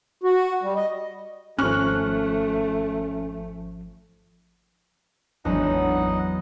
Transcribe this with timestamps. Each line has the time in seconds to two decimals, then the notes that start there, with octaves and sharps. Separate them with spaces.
0.23 F#4
0.63 G3
0.75 D#5
1.59 G#1 F3 A3 C#4 C#6 F6 F#6
5.45 G#1 E2 F#3 D4 D#4 D#5 F#5